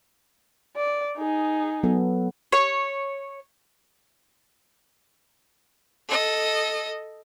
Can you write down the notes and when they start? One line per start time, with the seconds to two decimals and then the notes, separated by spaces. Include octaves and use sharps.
0.76 D5
1.17 D#4 G#4
1.83 F#3 B3 A4
2.52 C#5
6.08 A4 D#5